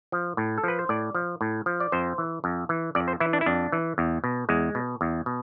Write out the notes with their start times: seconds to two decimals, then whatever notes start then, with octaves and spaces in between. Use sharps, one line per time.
0.12 F3
0.37 A2
0.58 A4
0.64 F3 B4
0.79 C5
0.89 A2 D5
1.15 F3
1.41 A2
1.66 F3
1.80 D5
1.92 F2 C5
2.18 E3
2.44 F2
2.69 E3
2.95 F2 D5
3.08 C5
3.20 E3 E4
3.33 D4
3.41 E4
3.46 F2 D4
3.72 E3
3.98 E2
4.24 B2
4.49 E2 G#3
4.75 B2
5.01 E2
5.26 B2